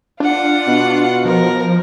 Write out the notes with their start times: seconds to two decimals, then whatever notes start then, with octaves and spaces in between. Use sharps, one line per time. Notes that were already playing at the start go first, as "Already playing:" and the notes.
0.20 D4 F4 F#5
0.67 B2
1.25 F3 A#4